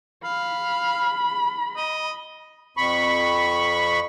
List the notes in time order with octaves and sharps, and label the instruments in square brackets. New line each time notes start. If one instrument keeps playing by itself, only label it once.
[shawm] F5 [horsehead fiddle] B5
[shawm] D#5
[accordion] F2 B5 C#6